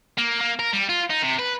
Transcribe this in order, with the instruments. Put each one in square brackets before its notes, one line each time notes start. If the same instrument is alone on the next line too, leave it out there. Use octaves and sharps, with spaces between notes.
[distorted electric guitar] A#3
A#3
A#4
G3
F4
D#4
C3
B4